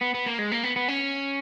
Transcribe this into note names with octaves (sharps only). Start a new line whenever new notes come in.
B3
B3
A#3
G#3
A#3
B3
B3
C#4